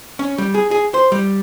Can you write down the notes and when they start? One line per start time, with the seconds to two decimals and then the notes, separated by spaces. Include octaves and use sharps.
0.19 C#4
0.38 G3
0.54 G#4
0.71 G#4
0.94 C5
1.12 G3